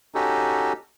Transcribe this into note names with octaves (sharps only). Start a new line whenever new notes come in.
C#4 D#4 F#4 G4 A4